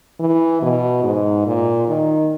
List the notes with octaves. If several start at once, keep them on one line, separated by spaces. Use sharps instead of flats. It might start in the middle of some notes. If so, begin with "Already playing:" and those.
E3
B2
G#2
A#2
D#3